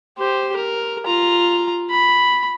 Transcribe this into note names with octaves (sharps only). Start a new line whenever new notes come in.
G4 C5
A#4
F4 A#5
B5